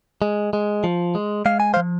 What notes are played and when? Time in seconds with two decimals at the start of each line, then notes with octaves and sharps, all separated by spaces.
0.22 G#3
0.53 G#3
0.84 F3
1.15 G#3
1.46 G#3 F5
1.60 G#5
1.74 C5 F5
1.77 F3